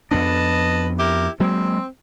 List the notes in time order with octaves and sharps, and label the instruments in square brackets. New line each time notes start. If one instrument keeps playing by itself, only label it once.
[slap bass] F2 B3 D4 [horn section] B4 D#5 A5
[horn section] E4 G4 A#4
[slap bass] F#3 G#3 A#3 [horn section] C4